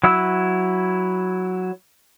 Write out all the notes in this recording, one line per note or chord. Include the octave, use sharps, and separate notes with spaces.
F#3 E4 E6